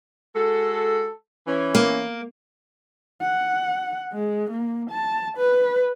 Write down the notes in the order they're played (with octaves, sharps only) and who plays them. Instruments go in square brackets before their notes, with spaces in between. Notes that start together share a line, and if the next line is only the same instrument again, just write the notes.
[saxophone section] G#3 F#4 A4
E3 C#4
[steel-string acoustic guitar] A#3
[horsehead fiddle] F#5
G#3
A#3
A5
B4